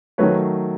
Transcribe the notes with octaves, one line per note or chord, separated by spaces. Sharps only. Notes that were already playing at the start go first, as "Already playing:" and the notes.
D#3 F#3 A3 B4 C#5